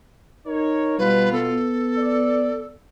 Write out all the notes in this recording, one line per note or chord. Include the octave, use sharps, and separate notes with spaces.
D#4 A#4 C#5
B2 G3 F4 B4
B3 A4
D5